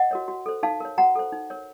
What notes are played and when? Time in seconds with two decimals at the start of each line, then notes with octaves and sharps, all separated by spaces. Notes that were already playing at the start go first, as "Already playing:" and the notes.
Already playing: D#5 F#5
0.11 F#4 A#4 C#5
0.28 F#4
0.46 A4 C5
0.63 D#4 F5 A5
0.80 A#4 C#5
0.98 F#4 F#5 A#5
1.15 A4 C5
1.32 D#4
1.50 A#4 C#5